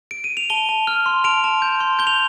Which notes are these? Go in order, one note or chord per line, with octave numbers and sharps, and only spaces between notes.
D7
D#7
F7
A5 D#7 G7
A5
F6
C6
A5 D7 F7
A5
G6
C6
G6 G7
F7